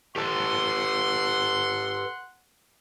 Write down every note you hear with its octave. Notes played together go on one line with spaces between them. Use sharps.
G4 A4 B4 F#5 C6